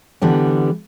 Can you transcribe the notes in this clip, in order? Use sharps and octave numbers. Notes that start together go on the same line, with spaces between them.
D3 E3 G3 B3